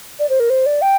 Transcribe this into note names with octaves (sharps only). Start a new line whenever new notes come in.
D5
C5
A#4
C5
D5
G5